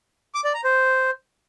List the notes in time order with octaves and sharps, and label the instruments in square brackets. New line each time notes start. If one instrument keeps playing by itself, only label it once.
[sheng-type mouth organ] D6
D5
A#5
C5